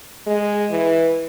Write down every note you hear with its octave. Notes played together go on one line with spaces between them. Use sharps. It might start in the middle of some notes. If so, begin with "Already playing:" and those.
G#3
E3